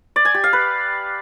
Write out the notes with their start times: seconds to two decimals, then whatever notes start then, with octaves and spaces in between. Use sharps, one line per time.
0.16 D5
0.25 G#5
0.34 G4
0.44 F5
0.53 B4